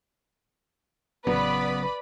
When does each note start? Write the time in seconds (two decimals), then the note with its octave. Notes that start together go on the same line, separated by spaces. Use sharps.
1.27 A1 C#3 F#3 B3 B4 D5 B5